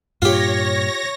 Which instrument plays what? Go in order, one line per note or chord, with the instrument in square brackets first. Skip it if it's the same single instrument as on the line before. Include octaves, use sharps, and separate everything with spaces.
[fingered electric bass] G2 A#2 [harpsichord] F4 G4 [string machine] C#5 A#6